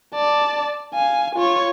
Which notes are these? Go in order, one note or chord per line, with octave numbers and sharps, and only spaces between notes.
D5 A5
F5 G#5
F4 C#5